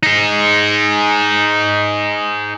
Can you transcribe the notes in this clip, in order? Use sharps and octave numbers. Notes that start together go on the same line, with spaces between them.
D#4 G#4